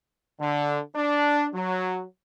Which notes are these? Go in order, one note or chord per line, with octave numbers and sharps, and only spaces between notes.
D3
D4
F#3